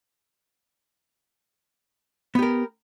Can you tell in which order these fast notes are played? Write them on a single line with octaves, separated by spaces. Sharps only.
B3 G4 A#4